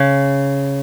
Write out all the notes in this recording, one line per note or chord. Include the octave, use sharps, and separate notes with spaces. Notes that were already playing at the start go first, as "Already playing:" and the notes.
Already playing: C#3